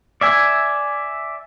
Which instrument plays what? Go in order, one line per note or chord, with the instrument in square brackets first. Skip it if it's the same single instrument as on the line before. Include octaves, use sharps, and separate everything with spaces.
[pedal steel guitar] D5 E5 G#5